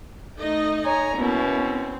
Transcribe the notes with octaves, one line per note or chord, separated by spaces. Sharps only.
A3 D#4 D#5
C#5 G#5 A#5
B2 A#3 B3 C#4 E4
C4